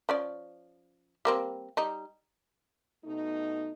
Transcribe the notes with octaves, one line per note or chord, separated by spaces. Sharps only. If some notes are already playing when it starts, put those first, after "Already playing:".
F3 C#4 D5
G3 A#3 C4
G3 D#4
B2 A3 D#4